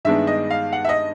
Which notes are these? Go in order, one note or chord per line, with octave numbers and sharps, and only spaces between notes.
G2 D#3 G#3 B3 D4 E5
D#5
F5
F#5
E5
D#5